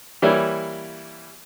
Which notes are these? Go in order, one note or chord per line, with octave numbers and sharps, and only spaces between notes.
E3 G3 A#3 E4 C#5